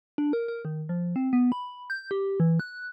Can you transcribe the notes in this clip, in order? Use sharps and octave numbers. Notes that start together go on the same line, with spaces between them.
D4
A#4
A#4
D#3
F3
C4
B3
B5
G6
G4
E3
F#6